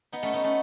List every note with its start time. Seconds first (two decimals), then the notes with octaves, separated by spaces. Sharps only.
0.12 B3 D#4
0.23 A3 C#4
0.33 B3 D#4
0.44 A3 C#4